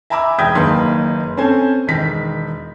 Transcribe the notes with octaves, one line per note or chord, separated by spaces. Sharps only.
E5 G#5 A#5 B5 D6 E6
E1 G5 D#6 G#6 B6
F#1 D#3 A#3 B4 C6
C4 C#4 A4 C5 G#5
E1 D#3 B6